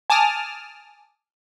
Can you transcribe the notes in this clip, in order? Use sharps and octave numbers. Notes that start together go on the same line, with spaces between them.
G#5 A5 D6 D#6 F6